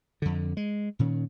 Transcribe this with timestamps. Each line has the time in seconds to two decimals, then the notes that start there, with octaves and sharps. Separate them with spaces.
0.22 F2 D3
0.57 G#3
0.99 A#2 D#3 C#4